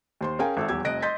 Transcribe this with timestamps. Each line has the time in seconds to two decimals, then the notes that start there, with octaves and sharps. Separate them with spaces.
0.21 D#2 C5 C6
0.39 C#4 G#4 A#4 F5 G5 G#5
0.57 G#1 A4 E5
0.69 D#1 E2 G4 E6 G#6
0.84 F1 F2 D#5 F#6 A#6 D7
1.02 D#5 C6 G6 A6 B6